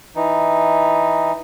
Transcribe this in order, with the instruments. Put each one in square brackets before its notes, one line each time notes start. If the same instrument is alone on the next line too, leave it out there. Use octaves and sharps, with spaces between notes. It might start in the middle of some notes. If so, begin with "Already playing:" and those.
[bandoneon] E3 D#4